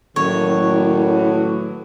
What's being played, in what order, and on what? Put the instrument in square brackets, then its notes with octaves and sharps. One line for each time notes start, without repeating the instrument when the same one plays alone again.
[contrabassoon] F#1 [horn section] A2 E3 F#3 [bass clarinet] D#3 [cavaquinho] C#5